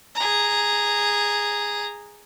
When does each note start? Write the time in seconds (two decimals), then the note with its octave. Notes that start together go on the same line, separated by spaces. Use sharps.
0.15 G#4 A#5